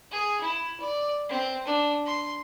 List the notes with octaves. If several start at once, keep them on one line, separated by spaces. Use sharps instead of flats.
G#4
E4
D5
C4
D4
C6